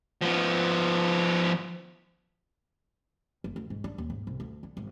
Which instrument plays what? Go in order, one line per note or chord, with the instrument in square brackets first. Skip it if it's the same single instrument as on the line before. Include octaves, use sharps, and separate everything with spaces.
[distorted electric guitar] F3 B3
[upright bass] F#1
D2
G#2
D4
D#2
G#2
C2
D2
D3
G#1